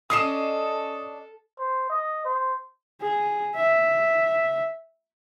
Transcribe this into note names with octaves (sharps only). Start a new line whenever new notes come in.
C#4 D4 A4 D#5 D#6 C7 E7
C5
D#5
C5
G#4
E5